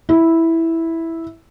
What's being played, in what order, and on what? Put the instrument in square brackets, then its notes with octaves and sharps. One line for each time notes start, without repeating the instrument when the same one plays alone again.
[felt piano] E4